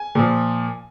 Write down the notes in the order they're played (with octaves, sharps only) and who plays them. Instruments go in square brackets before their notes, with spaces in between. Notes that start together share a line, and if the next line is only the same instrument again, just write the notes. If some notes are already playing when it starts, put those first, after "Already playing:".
Already playing: [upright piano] G#5
A#2 F3